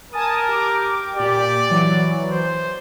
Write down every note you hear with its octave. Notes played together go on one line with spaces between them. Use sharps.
A#4 G#5 A5 D#6
G4 D6
A#2 G4 D5
E3 F#3
C5